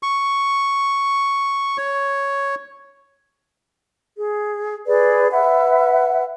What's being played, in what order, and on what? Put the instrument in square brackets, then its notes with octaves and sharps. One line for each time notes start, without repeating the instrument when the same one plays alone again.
[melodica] C#6
C#5
[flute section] G#4
G#4 B4 D5
B4 E5 F#5